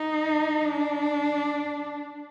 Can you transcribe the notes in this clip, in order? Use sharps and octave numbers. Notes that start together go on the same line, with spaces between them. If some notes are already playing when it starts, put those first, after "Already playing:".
Already playing: D#4
D4